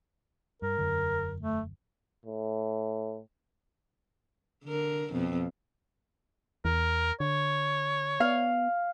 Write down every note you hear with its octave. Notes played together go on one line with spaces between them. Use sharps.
G2 A#4
E1 F#2 D3
A3
A2
D3 A#4
F2 B2
E2 A#4
D3 C#5
B3 F5